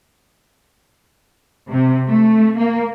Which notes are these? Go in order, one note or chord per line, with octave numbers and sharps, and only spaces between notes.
C3
A3
A#3